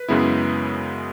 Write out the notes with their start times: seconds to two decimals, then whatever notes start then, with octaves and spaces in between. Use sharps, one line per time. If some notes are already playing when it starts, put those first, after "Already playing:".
Already playing: B4
0.08 F#2 C#3 G#3 B3 E4